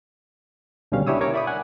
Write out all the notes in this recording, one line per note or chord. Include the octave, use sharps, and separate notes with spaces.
C#2 B2 D3 G3 C#4 F5
D4 E4 G4 C#5 D#6 E6
A#4 C#5 D6
D5 E5 B5 D6 D#6
F#5 G#5 F#6